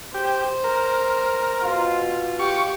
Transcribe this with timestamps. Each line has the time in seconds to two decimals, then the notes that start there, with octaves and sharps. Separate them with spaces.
0.14 G4 C5
0.64 A#4
1.63 B2 F4
2.39 G4 C#6